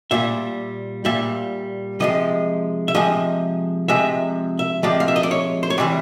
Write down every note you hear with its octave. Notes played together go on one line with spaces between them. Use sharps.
A#2 G3 E5
A#2 G3 E5
C3 F3 G#3 D#5
E5
C3 F3 G#3 D#5
C3 F3 G#3 E5
E5
C3 F3 G#3 D5
F5
E5
D#5
D5
C#5
C5
C#5
C3 E3 G3 D5